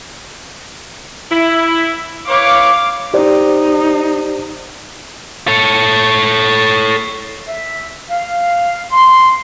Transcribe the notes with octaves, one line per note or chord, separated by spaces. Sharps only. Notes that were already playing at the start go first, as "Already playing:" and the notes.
E4
E4 B4 C#5 F5 D6
D#4 G4 C5 D5
A4 C#5
E5
F5
C6